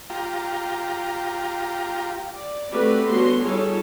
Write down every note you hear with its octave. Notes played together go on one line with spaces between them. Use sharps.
F4 G4 A#5
D5
A3 C4 F#4 G4 B4 D5
D3 G3 B3 C#4 F#4 C6
G3 D#4 F4 G#4 A4 C#5